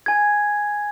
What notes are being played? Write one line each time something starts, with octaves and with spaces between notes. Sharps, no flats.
G#5 G#6